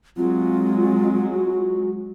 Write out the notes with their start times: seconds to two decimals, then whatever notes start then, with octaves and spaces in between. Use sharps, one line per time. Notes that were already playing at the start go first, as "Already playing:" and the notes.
0.17 F#3 G#3 C4 F4
1.34 F#4